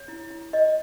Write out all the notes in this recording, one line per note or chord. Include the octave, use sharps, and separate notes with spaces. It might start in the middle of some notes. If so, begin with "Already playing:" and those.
Already playing: C#5
E4
E4
C#5 D#5